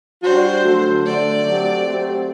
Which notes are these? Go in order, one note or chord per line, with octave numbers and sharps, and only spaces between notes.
G3 D4 F#4 C5
D3 F#3 A3
D3 F#3 A3 D5
F#3 A3 C4 G4
F#3 A3 C4 G4